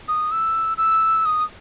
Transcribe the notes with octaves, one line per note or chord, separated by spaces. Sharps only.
D#6
E6
E6
D#6